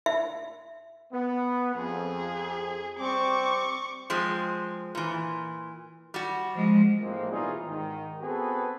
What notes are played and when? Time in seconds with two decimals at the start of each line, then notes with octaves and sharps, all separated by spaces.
0.06 E5
1.13 B3
1.75 F2 G#4
2.99 G3 C4 C#6 D6
4.10 F3 G#3 C4
4.95 A#2 E3
6.14 G3 F#4
6.54 F3 G#3
7.00 A#1 A2 F3 G#3 A#3 C4
7.30 B2 E3 G3 D#4 F4 G#4
7.65 G#2 D#3
8.21 B3 C4 F#4 G#4 A4 B4